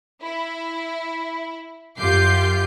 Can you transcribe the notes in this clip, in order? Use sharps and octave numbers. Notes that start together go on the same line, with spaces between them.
E4
F#2 F4 G4 D6 G6 C7